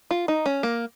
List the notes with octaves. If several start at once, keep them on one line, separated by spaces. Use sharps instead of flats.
F4
D#4
C#4
A#3